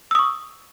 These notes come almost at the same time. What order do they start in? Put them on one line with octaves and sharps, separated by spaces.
E6 D#6 C#6